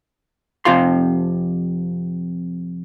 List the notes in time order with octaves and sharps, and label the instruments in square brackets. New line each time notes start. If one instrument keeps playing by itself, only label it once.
[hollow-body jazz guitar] F2 C3 F4 F5 C6